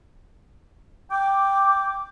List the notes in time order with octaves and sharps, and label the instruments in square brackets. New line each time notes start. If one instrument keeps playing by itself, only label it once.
[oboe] G5 [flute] D6